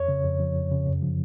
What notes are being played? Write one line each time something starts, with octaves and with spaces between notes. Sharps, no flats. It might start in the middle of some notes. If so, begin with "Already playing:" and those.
Already playing: F2 C#5
C#3
F2
F3
F2
C#3
F#2
F3